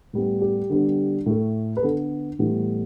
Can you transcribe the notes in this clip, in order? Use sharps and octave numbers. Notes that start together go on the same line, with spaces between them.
A2 G3 B3
G4
D3 G3 B3
A2 A3
B4
D3 B3 A4
A2 E3 G3 B3